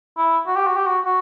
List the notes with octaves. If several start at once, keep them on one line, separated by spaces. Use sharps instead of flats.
E4
F#4
G4
F#4
G4
F#4
F#4